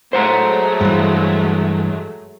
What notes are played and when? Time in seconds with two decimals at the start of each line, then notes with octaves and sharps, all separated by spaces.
0.13 F#3 G#3 A3 C5 F#5 A#5
0.81 G2 E3